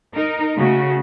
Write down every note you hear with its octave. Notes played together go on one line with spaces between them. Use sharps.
D#4 A#4
C#3 A3 F#4